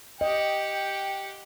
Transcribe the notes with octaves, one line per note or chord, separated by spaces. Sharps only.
G4 D#5 F#5 G5